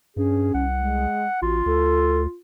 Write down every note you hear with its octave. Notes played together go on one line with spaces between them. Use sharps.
G2 C#4 G#4
C2 F#5
G#3
A1 F4 F#4
D2 A4